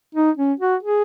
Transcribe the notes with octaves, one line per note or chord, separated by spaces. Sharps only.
D#4
C#4
F#4
G#4